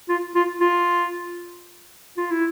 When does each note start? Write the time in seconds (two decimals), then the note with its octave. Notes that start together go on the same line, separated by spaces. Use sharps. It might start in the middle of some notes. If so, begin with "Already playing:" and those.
0.09 F4
0.35 F4
0.61 F4
2.18 F4
2.31 E4